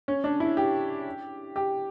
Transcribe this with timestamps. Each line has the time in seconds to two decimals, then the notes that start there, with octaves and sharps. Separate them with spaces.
0.08 C#4
0.24 D4
0.40 E4
0.57 G4
1.56 G4